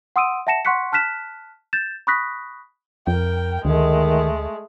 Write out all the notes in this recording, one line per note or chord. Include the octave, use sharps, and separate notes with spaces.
F#5 C6 D#6 E6 D7 D#7
E5 F#5 A5 A#6 C#7 E7
F#5 C6 C#6 F#6 B6 C#7
A5 F6 F#6 B6 E7
G6 A6 E7
B5 C#6 D#6 F#6 A#6 B6
F2 A#4 G5
D2 D#3 G#3 A3